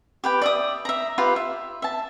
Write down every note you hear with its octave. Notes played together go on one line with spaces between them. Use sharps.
G4 B4 G5
D5 E5 D#6
E5 A#5
F4 G4 B4 F5
E5
E5 A5